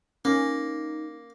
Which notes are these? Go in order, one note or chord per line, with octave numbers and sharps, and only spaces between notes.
A#3 C#4 D#4